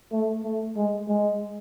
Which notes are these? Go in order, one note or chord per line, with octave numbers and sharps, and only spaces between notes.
A3
A3
G#3
G#3